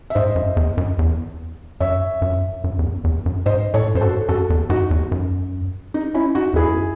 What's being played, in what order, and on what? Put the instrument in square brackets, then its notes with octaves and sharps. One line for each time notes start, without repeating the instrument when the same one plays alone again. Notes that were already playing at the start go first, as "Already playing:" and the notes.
[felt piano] E5
[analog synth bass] G#2 [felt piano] C5 D#5
[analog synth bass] F#2
E2
F#2
E2
[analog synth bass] F#2 [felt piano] C#5 E5
[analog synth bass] F#2
F#2
E2
F#2
E2
F#2
[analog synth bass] G#2 [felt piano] C5 D#5
[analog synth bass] A2 [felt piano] A4 C#5
[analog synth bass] F#2 [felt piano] C5
[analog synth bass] G#2 [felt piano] F#4 A4
[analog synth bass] F#2 [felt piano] F#4 A4
[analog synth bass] E2
[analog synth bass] F#2 [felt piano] D#4 F#4
[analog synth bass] E2
F#2
[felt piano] D#4
C#4 E4
D#4 F#4
[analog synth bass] E2 [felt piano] E4 G#4
[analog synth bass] F#2